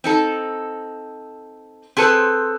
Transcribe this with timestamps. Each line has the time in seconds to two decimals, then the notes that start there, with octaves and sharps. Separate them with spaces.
0.04 C4 D#4 A4
1.97 C4 G#4 A4 B4 C5